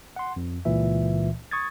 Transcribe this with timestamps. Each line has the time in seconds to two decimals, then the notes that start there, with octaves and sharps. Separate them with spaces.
0.16 F#5 C6
0.36 F2
0.65 C#2 A#2 E3 E5
1.51 C#6 D#6 G#6 A6